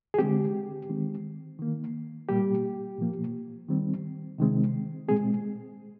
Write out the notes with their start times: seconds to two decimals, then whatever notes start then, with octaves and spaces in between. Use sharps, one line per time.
0.14 G#4
0.19 D3 G#3 C4 G4
0.89 D#3 G#3 C4
1.59 D#3 A#3
2.29 A#2 G3 A#3 G4
2.98 A#2 F3 A#3
3.68 D#3 G3 C4
4.38 C3 D#3 G#3 C4
5.08 A#2 G#3 C4 G#4